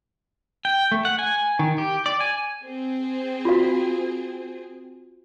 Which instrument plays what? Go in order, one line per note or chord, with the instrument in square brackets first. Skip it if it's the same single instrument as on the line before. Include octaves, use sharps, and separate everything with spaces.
[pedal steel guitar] G5
A3
F#5
G#5
D#3
G4
D5
G#5
[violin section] C4 G#4
[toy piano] F4 F#4 F5